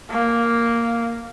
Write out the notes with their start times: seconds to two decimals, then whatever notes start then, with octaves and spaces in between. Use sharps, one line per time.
0.10 A#3